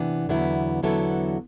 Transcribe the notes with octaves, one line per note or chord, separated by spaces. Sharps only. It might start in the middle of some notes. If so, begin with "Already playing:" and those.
Already playing: C3 E3 B3 D4
E2 D3 F#3 B3 E4
E2 D3 F#3 B3 E4 A4